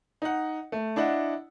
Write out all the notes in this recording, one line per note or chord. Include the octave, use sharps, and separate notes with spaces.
D#4 F#5
A3
D4 E4 D#5 F#5